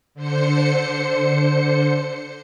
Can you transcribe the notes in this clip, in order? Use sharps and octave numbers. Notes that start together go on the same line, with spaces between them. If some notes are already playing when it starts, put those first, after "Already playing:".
D3 C5 C#7